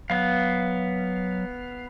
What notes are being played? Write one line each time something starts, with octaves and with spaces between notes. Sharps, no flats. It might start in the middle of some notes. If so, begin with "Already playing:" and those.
F#3 B3 F5